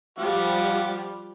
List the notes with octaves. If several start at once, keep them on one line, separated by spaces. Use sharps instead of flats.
F3 G3 G4 F5 F#5